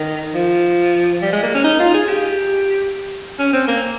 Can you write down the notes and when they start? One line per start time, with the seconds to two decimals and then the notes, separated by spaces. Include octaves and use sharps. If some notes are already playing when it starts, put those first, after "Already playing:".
Already playing: D#3
0.34 F3
1.22 G3
1.32 G#3
1.43 A#3
1.54 C#4
1.64 D#4
1.80 F4
1.94 G#4
2.08 G4
3.39 C#4
3.53 C4
3.68 A#3